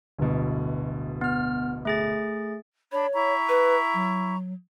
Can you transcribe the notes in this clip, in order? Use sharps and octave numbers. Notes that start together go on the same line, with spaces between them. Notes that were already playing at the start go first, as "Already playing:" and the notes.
D1 G1 B2
B3 F6
A3 G#4 A6
D4 C#5 B5
E4 A#5 C#6
B4
F#3